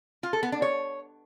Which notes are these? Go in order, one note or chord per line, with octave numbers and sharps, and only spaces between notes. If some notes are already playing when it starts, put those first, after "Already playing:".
F4
A4
B3
D4
C#5